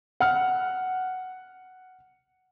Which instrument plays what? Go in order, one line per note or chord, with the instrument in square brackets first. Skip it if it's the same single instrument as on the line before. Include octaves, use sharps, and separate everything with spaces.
[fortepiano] F#5 F6